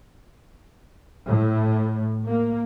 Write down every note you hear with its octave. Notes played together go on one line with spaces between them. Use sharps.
A2
A#3